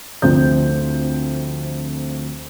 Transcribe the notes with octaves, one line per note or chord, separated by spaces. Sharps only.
D2 F3 C4 G6